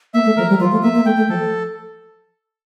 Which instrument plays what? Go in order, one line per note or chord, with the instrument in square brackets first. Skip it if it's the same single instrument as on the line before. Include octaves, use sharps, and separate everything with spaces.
[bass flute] A#3 [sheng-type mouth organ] E5
[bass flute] A3
[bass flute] F3 [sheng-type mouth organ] A#4
[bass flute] G3
[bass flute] F3 [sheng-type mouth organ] F4
[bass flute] A3
[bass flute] A#3 [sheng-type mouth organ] E5
[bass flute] A#3
[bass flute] A3 [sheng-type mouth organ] G5
[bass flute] A3
[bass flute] F3 [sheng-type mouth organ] A4